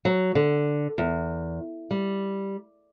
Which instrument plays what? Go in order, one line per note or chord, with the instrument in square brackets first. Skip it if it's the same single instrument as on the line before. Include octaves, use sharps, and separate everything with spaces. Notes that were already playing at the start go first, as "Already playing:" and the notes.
[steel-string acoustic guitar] F#3
D3
E2
G3